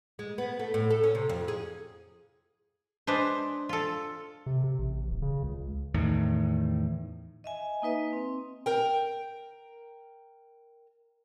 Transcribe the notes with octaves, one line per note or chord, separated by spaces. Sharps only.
G#3
B3
A3
A2
A4
C#4
C3
F2
G#4
G#3 D4 B4 C5
F4 A4
C3
C3
A1
D1
C#3
C#2
E2 A2 D#3
D#5 E5 G#5
A#3 D#4 B4 D#5
C4
A#4 G5